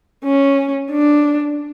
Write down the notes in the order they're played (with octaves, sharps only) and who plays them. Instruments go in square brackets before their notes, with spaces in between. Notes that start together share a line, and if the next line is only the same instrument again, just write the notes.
[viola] C#4
D4